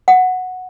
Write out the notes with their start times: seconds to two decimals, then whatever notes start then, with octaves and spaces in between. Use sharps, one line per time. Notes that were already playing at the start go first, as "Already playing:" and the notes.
0.08 F#5